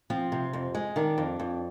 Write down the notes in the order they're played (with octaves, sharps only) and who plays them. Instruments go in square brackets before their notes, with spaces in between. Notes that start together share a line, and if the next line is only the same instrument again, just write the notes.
[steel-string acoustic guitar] F3 C4
C3
F2
G#3
D#3 D4
F2
F2